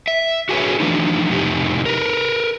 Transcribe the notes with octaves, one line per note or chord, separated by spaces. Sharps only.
E5
F#4 G#4 A4 B4 C#5
E3 F3 A3 D4 D#4
F2 A2 C3 D#4 G4
A#4 B4